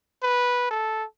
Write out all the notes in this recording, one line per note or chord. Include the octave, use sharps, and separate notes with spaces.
B4
A4